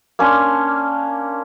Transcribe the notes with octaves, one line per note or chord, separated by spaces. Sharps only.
A#3 C#4 D4 C6